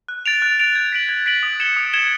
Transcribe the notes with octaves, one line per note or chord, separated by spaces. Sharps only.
F#6
A6 D7 F7
F#6
A6 D7 F7
G#6
B6 D7 F#7
G#6
B6 D7 F#7
D#6
G#6 C#7 E7 G7
D#6
G#6 C#7 E7 G7